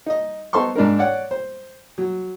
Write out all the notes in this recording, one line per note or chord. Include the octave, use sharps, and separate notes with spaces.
D#4 D#5
B3 D#4 A4 C5 C6 C#6
G#2 D4 D#4 A#4
C#5 D5 F#5
C5
F#3